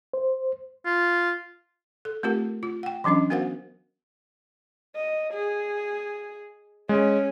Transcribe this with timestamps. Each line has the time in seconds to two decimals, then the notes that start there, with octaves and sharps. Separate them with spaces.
0.13 C5
0.86 F4
2.05 A4
2.23 A3 C4 F4 G4 A#4
2.63 F4
2.83 F#5 G5
3.04 E3 F#3 C#4 D4 D#5
3.30 B3 F#4 A#4 C5 F5 F#5
4.95 D#5
5.33 G#4
6.89 G#3 C#4